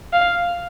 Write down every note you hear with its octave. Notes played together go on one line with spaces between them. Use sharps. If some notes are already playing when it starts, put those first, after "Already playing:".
F5